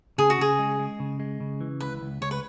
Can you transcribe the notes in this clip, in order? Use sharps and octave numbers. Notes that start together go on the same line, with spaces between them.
C#3 G#4
F#4
C#3 G#4
G#3
G#3
C#3
G#3
C#3
E3
C#2 B4
C#2
C#2 C#5
B4